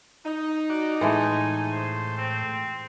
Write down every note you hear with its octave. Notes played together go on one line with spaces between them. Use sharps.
D#4
F#4 D5
A2 E3 G#3 A3 G#5
C5
C4